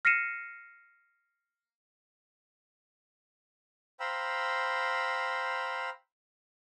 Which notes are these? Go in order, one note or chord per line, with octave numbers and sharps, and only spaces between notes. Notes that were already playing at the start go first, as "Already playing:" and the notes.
F6 A#6 C7 C#7 D#7 E7
C5 F5 G5 A#5 B5 E6